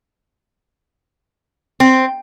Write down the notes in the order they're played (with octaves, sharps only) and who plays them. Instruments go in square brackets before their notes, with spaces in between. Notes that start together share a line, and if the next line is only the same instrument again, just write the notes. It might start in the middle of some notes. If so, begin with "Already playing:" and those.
[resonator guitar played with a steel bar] C4